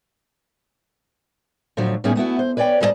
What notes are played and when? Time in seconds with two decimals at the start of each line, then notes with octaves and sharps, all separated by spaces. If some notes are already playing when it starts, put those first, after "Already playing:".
1.77 A2 D3 F3 F#3
2.04 A2 G3 B3 C#4 D#4 G#4
2.16 A3 B3 E4 F#4
2.39 C5
2.57 B4 C#5 D5 F#5 G5
2.80 G#2 G3 F4 B4 D#5 A5